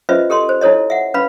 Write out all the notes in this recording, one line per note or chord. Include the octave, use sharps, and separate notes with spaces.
C#4 F4 B4 C5 D#5 E5
G4 A4 D#5 C6
C5
D#4 E4 A4 C#5 D#5
E5 F#5
C#4 B4 F5 B5